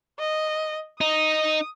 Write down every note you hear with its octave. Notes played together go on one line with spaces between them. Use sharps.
D#5
D#4 D#6